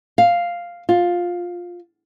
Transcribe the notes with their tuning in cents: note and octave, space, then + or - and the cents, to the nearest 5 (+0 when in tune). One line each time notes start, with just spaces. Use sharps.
F5 +0
F4 +10